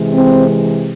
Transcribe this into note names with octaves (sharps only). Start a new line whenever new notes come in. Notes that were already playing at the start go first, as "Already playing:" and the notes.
Already playing: C3 E3 G#3
C4